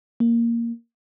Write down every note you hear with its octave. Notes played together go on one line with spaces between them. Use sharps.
A#3